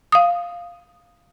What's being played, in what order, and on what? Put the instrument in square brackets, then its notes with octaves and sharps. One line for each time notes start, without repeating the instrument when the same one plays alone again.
[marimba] F5 D#6